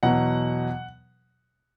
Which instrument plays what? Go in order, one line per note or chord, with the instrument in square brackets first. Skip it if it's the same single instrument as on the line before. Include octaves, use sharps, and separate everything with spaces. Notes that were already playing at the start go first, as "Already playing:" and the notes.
[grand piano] E2 B2 F#3 F#5